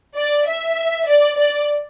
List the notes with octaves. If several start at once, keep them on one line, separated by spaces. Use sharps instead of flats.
D5
E5
D5
D5